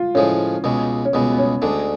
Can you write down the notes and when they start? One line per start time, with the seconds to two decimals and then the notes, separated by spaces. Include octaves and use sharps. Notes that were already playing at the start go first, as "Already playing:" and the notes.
Already playing: F4
0.15 A2 F3 G#3 C#4
0.64 C#2 B2 G#3
1.05 C#4
1.13 C#2 B2 G#3 B3
1.32 B3
1.38 C#4
1.62 D2 D3 G#3 D4